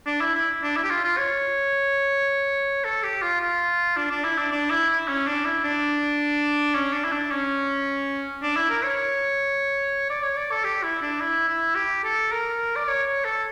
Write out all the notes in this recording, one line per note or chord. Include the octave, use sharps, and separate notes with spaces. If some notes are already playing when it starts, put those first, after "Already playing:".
D4
E4
E4
D4
E4
G4
F4
F4
C#5
A4
G4
F4
F4
D4
D4
E4
D4
D4
E4
E4
C#4
D4
E4
D4
C#4
D4
E4
D4
C#4
D4
E4
A#4
C#5
D5
C#5
D5
A4
G4
E4
D4
E4
E4
G4
A4
A#4
D5
C#5
C#5
A4